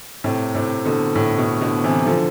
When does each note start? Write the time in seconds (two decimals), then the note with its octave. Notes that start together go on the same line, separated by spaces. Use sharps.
0.24 A2 C3
0.55 A2 C3
0.85 B2 D3
1.16 A2
1.38 B2
1.61 B2 D3
1.84 C3 E3
2.07 D3 F3